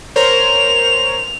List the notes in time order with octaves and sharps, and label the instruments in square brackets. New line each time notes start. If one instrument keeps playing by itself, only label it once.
[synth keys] A#4 C5 C#5 [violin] F7